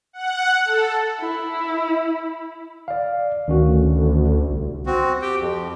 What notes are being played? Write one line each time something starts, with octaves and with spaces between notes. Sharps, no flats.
F#5
A4
E4
D5 F5
D2 D#3 C#4 F#4
C2
C4 F#4
G4 G5
F2